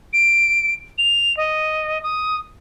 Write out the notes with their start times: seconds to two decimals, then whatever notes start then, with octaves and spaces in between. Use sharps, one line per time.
0.13 D7
0.98 F7
1.37 D#5
2.03 D#6